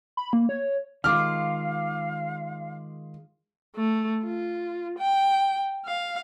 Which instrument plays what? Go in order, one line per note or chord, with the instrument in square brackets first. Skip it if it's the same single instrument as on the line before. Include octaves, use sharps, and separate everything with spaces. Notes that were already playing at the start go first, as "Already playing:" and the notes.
[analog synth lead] B5
A#3
C#5
[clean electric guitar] D#3 G#3 F4 [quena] F5 [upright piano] D6 F6
[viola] A3
F4
G5
F5